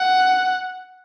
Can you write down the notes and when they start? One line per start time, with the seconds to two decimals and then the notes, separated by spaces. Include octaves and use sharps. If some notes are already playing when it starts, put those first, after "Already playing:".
Already playing: F#5